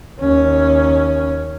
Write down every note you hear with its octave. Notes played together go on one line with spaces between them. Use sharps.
D#2 C#4